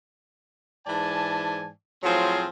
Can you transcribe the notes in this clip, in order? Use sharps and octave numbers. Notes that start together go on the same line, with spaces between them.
G#2 E3 D5 G#5 A5
A2 F3 F#3 C4 F4 G#4